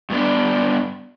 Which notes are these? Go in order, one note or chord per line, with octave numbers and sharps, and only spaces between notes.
G2 B3 D4